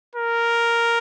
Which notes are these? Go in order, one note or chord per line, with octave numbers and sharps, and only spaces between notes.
A#4